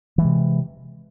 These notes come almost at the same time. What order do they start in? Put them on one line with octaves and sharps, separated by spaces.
E3 G#3 C3